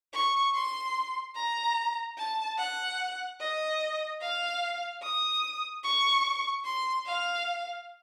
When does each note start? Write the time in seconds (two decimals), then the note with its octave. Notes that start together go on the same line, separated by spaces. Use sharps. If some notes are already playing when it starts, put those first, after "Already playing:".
0.13 C#6
0.54 C6
1.35 A#5
2.17 A5
2.58 F#5
3.40 D#5
4.21 F5
5.02 D#6
5.84 C#6
6.65 C6
7.06 F5